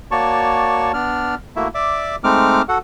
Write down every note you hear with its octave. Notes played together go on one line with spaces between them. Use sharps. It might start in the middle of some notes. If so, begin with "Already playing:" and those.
A#3 F#4 C#5 D5 A5 C#6
B3 D4 D5 F6
A3 A#3 E4 F#4 E5
D5 E5 D6
G#3 A3 C4 D#4 D6 F6
F#4 A4 F#5